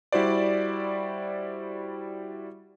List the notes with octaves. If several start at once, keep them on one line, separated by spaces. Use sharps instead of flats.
G3 E4 F#4 C5 D5